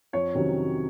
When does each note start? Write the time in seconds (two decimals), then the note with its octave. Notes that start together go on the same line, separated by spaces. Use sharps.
0.13 F2 C#5
0.35 C3 D#3 F#3 C#4